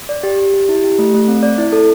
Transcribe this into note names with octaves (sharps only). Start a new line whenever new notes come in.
D5
G4
G4
G4
E4
G4
A3
A3
C4
D5
E4
A4